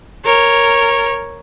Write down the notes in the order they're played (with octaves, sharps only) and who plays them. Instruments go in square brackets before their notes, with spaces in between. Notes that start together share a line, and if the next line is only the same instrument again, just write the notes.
[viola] A#4 C#5